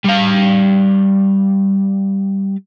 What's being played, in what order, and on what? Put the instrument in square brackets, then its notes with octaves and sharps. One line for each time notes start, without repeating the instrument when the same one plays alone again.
[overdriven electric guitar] G3 F5